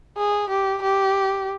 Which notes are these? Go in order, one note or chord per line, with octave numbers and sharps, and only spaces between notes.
G#4
G4
G4